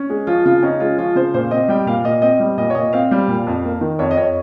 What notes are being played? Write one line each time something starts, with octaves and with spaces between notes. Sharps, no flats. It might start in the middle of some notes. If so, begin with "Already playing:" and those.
Already playing: C#4
G#3
F3 F4
C#3 F4
C#4 D#4
G#3 F4
F3 F4
C#3 C5
A#2 C5
C4 D#5
G3 G5
A#2 F5
A#2 D#5
C4 D#5
G3
A#2 D#5
C#5
A#2 D#5
C4 F5
G3
A#2
F2
A#3
D#3
F2 C#5
D#5
F2 C#5